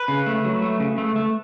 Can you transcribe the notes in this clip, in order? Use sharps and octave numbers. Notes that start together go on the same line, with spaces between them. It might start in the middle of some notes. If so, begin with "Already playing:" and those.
Already playing: B4
C#3
A3
F#3
A3
C#3
A3
A3